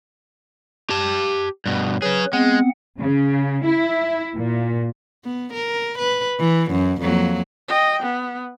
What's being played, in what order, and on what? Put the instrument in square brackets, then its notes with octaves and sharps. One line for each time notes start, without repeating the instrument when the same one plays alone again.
[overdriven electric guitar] G4 A5
G2 B2
[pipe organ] F#3 B4 [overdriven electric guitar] C#4 G#4
[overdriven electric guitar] G#3 [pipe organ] B3 C4 F#5
[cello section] C#3
E4
A#2
[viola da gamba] B3
A#4
B4
E3
F#2
F2 F#3 A#3
[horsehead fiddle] D#5 G5
B3